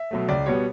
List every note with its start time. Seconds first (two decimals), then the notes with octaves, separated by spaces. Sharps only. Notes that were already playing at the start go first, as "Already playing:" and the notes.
Already playing: E5
0.11 B2 F#3 A3
0.29 C#2 D5
0.46 B2 G3 B3 C#5